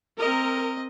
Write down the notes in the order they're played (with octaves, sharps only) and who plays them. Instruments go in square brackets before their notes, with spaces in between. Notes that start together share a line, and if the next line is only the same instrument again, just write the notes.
[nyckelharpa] C4 D#5 [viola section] A#4